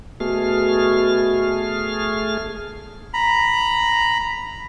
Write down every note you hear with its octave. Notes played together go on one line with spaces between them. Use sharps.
B2 A3 G#4 F6
A#5 B5